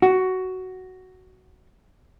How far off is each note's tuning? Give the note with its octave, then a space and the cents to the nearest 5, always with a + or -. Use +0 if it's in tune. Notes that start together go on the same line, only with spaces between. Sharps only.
F#4 +10